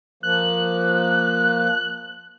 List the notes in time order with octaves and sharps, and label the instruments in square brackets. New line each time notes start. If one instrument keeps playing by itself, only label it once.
[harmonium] F3 A#3 [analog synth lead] F#6